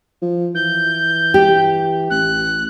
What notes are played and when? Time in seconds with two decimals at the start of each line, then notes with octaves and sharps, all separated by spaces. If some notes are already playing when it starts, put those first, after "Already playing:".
0.22 F3
0.55 E3 G6
1.34 G4
2.10 A1 F#6